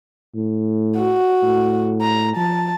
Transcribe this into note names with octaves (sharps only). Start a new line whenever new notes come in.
A2
F#4
A2
A#5
F3 A5